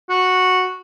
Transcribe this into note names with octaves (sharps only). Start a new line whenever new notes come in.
F#4